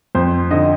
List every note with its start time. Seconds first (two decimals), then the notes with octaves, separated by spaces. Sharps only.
0.15 F2 C5
0.51 D3 D#5